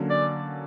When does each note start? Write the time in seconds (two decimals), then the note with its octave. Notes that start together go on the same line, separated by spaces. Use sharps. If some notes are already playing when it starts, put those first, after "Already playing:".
Already playing: D3 F#3 A#3 C#4
0.10 D5